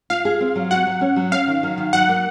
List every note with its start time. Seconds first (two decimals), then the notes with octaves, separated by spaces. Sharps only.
0.10 F4 F5
0.25 G#4
0.41 C4
0.55 F#3
0.71 F#4 F#5
0.87 F#3
1.01 C#4
1.16 F#3
1.32 C#4 F5
1.47 D#3
1.63 F#3
1.78 D#3
1.93 F#3 F#5
2.09 A#3